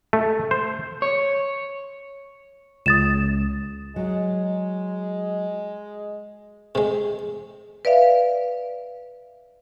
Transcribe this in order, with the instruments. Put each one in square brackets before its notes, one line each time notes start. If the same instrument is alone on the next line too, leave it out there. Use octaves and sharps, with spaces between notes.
[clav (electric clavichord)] A3
C5
[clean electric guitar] C#5
[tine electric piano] C#2 [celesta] D#6 A6 E7
[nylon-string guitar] F#3 [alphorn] G#3
[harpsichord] C3 G#3
[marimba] B4 D5 E5 F5